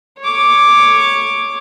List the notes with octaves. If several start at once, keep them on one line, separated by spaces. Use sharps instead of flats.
C#5 D6